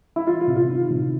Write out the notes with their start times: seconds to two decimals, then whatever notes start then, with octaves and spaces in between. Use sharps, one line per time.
0.16 E4
0.27 E3 F4
0.41 F4
0.48 C3
0.56 F4
0.69 D#3
0.91 C3